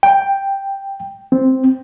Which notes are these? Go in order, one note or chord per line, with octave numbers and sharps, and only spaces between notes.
G5
C4